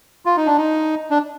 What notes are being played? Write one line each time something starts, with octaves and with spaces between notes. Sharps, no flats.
F4
D#4
D4
D#4
D4